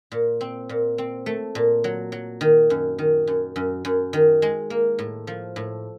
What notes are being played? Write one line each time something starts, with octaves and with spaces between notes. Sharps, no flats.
A#2
C4
A#2
C4
A3
A#2
F#3
F#3
D#3
F#2
D#3
F#2
F#2
F#2
D#3
G#3
A#3
A2
F3
A2